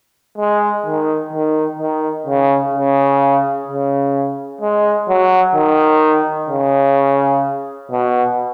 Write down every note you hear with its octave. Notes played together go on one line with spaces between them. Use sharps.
G#3
D#3
D#3
D#3
C#3
C#3
C#3
G#3
F#3
D#3
C#3
B2